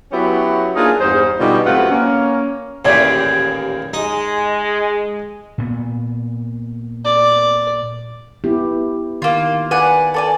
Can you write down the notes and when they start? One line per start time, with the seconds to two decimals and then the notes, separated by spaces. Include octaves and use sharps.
0.12 F#3 B3 C#4 E4 F#4 G4
0.76 A#3 D4 D#4 F4 G#4
1.00 E2 G2 D#4 C5
1.39 G#2 B2 D3 G3 D#4 F4
1.65 F#2 C3 A3 F4 B4 F#5
1.90 A#3 C#4
2.85 A1 D#2 A#2 G4 G#4 C#5 D5
3.93 G#3 D#4
5.58 A#2 B3
7.05 D5
8.44 B3 E4 G4
9.22 D#3 A#3 F4
9.71 B4 D5 F#5 G#5
10.14 A4 D5 G#5